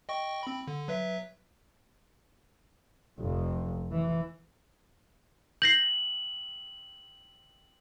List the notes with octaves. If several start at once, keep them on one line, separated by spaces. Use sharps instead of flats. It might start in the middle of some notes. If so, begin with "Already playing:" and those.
D#5 G5 C#6
C4 B5
D3
F#3 B4 E5
F1 F2
E3
G6 A#6 C7 F#7